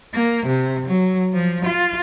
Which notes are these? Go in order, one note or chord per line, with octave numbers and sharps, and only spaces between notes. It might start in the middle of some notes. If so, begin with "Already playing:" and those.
A#3
C3
F#3
F3
F4